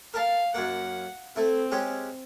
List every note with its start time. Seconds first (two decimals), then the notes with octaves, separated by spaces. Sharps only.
0.14 A#4 F5 A5
0.54 F#2 A#3 F#5
1.36 A3 C4 E4
1.72 G#3 C#4 G4